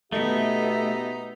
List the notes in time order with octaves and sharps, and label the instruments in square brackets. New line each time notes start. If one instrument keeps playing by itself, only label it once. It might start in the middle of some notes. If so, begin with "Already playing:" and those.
[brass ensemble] B2 G4 E5 [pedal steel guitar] A3 [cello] B3 [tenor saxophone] D#4